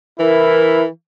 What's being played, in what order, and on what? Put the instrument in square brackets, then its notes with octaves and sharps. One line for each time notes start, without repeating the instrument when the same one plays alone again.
[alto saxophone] E3 [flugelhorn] E4 [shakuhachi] A#4